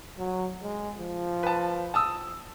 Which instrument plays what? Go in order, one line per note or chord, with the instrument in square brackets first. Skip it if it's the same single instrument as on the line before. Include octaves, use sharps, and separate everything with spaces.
[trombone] F#3
G#3
F3
[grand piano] B4 A5
A5 D#6 E6